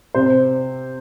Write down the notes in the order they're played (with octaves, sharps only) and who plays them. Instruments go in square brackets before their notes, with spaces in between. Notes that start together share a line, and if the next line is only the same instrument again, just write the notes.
[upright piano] C3 C5